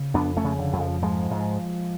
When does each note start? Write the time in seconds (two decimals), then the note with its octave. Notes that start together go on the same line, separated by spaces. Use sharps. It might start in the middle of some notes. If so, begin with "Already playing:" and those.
Already playing: C#3
0.14 F2 B3 D4
0.37 A3 C#4
0.44 C#3
0.59 D3
0.73 F2
0.80 F3
1.02 G#2 F3 G#3
1.31 G#2